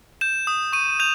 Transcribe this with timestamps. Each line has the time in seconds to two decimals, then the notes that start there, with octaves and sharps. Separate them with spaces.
0.21 G6 E7
0.47 D#6
0.73 C#6 D#7
1.00 G6 F7